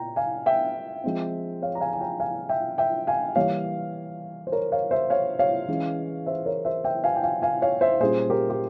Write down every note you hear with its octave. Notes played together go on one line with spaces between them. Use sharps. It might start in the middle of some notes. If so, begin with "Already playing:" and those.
Already playing: A#2 G5 A#5
F5 G#5
E5 G5
F3 G#3 C4
C#5 F5
A#5
F5 G#5
G#5
G5 A#5
F5 G#5
E5 G5
E5 G5
F5 G#5
E3 G3 A#3 C#5 F5
C5
A#4 C#5
C#5 F5
C5 E5
C#5 F5
C#5 F5
E3 G#3 C#4
C5 E5
A#4 C#5
C5 E5
E5 G5
F5 G#5
G5
F5 G#5
F5 G#5
C#5 F5
C5 E5
A#2 G3 C#4 G#4 C5
G4 A#4
G4